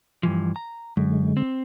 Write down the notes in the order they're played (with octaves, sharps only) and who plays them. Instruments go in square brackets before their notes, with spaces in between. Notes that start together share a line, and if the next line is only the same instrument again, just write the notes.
[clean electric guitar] G2 E3 F3
A#5
[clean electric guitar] F#2 [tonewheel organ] D3 G#3
[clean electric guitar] C4